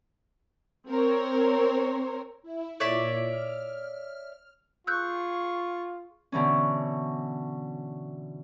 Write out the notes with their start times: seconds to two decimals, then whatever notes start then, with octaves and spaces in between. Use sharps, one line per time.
0.88 C4 A#4 C5 C#5
2.43 E4
2.80 A#2 E4 C#5 D5 E5
3.24 F6
4.87 F4 G#4 C#6 E6 F#6 G6
6.32 B2 D3 E3 C#4